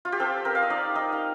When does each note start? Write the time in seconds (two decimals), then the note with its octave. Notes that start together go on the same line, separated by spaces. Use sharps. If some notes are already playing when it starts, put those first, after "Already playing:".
0.05 F4
0.12 G4
0.20 C4 A4
0.45 C4 A#4
0.55 F5
0.62 D#5
0.70 D#4 D5
0.95 D#4 D#5
1.12 F5